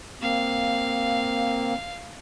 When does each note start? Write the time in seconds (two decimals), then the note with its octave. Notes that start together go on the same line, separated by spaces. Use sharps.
0.22 A#3 C4 F5